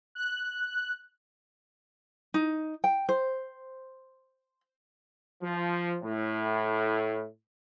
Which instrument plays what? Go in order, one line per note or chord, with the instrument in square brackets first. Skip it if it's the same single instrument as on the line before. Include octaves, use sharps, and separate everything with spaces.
[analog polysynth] F#6
[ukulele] D#4
G5
C5
[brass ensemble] F3
A2